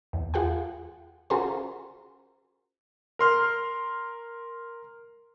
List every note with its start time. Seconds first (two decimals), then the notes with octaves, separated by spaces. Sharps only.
0.13 E2
0.34 F4 G#4 F#5 G5
1.30 C#4 F4 F#4 G#4 A#4 C5
3.19 A#4 C6 F6